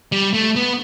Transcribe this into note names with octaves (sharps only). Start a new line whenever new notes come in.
G3
A3
B3